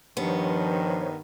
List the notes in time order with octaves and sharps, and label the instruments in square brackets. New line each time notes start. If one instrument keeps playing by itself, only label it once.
[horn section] G2 D#3 [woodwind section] F3 [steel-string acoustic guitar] B3 [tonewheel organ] C5 C#5